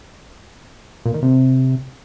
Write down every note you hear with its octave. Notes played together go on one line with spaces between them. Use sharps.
A#2
D#3
C3